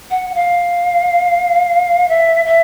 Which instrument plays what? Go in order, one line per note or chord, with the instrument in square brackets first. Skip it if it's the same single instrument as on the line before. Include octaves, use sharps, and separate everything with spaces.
[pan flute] F#5
F#5
F5
E5
E5